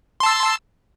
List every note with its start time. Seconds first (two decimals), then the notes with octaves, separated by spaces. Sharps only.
0.20 C6
0.23 A5
0.26 E6